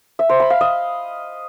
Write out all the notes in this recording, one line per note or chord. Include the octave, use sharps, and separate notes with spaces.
E5
C5
B5
F5
D#5